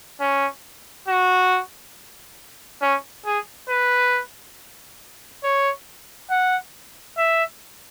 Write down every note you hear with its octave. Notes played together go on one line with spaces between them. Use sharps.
C#4
F#4
C#4
G#4
B4
C#5
F#5
E5